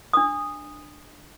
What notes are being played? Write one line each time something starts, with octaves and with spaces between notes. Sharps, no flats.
D4 D#6